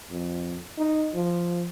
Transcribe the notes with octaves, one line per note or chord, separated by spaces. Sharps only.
F2
D#4
F3